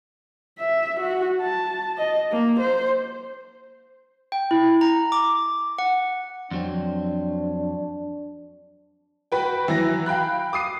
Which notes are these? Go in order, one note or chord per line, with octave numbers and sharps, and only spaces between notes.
E5
F#4
A5
D#5
A#3
C5
G5
E4
A#5
D6
F#5
F2 F#3 C4 D4
F#4 B4 G5
E3 F#3 A#6
F5 G5 B5 F#6
D6 D#6 C7 D#7